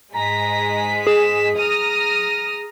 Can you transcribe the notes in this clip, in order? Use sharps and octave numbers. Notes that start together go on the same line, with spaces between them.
G#2 G#3 A#5 B6
G#4 E7
A#5 D#6 F6 D#7